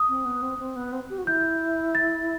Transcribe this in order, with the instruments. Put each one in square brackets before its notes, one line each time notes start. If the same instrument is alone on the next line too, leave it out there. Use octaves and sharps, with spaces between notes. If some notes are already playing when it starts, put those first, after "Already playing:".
Already playing: [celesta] D#6
[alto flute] C4
B3
C4
C4
B3
C4
G4
F#4
[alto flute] E4 [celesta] G6
[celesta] A6